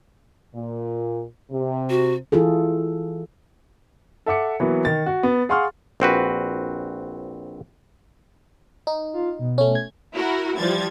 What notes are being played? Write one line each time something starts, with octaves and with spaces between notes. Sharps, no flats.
A#2
C3
F#4
E3 E4 F4 G#4 A4
A4 E5 F#5 D6 C#7
E3 F#3 A#3 B3
D#3 A6
F#4
B3
G#4 F5 F#5 C6 C#6 F6
A#1 C4 F#4 B4
D#4
F4
B2
A3 C#4
G#6
E4 F#4 A#4
E3 F3 G3 G#6 A6